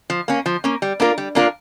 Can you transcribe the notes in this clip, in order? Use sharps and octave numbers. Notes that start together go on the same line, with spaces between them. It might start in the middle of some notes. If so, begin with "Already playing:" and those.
F3
A#3 C#4
F3
A#3 C#4
G3
A#3 D4 F4 A#4
G3
A#3 D4 F4 A#4